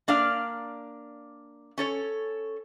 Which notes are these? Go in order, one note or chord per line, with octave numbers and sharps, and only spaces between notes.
A#3 D4 D5 F5
C#4 A4 C#5